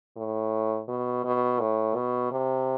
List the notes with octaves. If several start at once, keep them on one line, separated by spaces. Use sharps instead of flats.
A2
B2
B2
A2
B2
C3